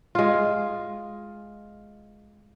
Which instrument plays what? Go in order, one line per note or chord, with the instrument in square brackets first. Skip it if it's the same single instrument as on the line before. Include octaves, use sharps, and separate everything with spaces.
[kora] G#3 F4